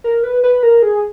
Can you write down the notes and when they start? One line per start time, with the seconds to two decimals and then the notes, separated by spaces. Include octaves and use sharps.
0.04 A#4
0.23 B4
0.44 B4
0.63 A#4
0.82 G#4